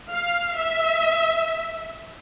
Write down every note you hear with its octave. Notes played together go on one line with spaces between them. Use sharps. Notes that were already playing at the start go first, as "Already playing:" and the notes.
F5
E5